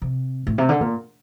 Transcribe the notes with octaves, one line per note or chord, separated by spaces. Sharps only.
C3
A2
C3
D3
A#2